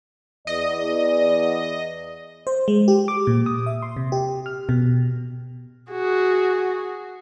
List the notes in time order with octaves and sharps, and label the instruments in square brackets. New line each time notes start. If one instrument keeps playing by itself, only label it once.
[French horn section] E2 D5 [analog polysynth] D#5
[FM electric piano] C5
G#3
G4
D6
A#2
D#6
E5
C6
C3
G4
F6
B2
[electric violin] F#4 [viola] G#4